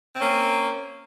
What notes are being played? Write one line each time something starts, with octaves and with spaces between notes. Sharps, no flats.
A#3 C4 C#4